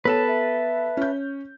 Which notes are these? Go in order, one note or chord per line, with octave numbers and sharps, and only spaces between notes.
B3 A4 B4 C#5 A5
E5
C#4 G6